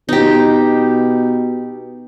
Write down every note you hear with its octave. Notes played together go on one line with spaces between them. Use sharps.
B2 D#4 G4